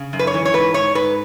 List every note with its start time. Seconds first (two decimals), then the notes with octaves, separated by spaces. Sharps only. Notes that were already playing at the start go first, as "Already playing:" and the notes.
Already playing: C#3
0.13 F#2
0.19 B4
0.27 C#5
0.34 E3
0.45 C#5
0.54 G#2 B4
0.74 G#2 C#5
0.95 G#2 B4